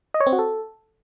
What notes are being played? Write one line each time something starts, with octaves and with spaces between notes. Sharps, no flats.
D#5
C#5
C4
F#4
A4